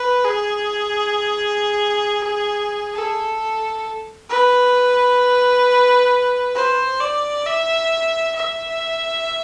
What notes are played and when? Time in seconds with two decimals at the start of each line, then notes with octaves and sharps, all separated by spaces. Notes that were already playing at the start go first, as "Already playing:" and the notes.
Already playing: B4
0.24 G#4
2.95 A4
4.30 B4
6.55 C5
7.01 D5
7.46 E5
8.36 E5